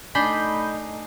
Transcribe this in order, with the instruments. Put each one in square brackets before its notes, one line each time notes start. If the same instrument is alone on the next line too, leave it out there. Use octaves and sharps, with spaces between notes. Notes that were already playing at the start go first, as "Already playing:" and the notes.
[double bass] A3 D#4 [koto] D4 [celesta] G#5 C7 [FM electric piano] B5 G6